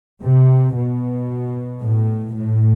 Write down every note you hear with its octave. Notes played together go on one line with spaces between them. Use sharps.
C3
B2
A2
A2